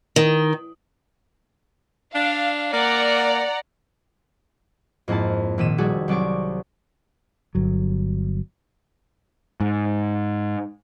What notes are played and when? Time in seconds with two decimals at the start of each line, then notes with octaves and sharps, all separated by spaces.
0.16 D#3
2.15 D4 F5
2.73 A#3 D5 F#5 A#5
5.08 F2 G#2 A#3 E4 A5
5.58 A#1 A#2 D#3 B6 D#7 E7
5.78 F1 G3 F#4 G#4 A4
6.08 C2 F#3 D5 C#6 D7
7.55 G1 F#3
9.60 G#2